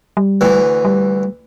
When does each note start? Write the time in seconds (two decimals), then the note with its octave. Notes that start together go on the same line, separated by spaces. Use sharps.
0.17 G3
0.41 D2 E3
0.85 G3